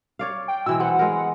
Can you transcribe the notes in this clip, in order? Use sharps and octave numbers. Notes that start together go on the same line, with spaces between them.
C#5 D5 F5
G5
B2 E3 G#3 E6
B3 C4 B4 F#5
G#3 B3 A#4